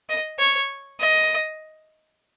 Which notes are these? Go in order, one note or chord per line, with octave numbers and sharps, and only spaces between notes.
D#5
C#5
D#5